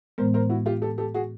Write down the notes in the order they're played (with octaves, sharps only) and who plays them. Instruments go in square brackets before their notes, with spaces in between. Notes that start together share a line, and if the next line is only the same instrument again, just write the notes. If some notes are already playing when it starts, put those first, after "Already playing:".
[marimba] A2 E3 G#3 B3 [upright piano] A#4 C5
[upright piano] A#4 C5
E4 F#4
F4 G4
G4 A4
G4 A4
F#4 G#4